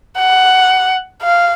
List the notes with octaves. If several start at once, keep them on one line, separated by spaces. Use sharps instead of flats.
F#5
F5